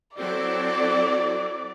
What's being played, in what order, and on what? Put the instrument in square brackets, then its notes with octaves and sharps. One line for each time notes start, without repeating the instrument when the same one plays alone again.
[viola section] F#3 C4 E4 A4 [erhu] D5